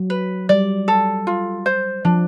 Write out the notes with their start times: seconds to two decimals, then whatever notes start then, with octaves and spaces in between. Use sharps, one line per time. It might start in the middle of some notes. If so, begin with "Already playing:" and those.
Already playing: F#3
0.10 B4
0.49 G3 D5
0.88 A4
1.27 F4
1.66 C5
2.05 F3 D4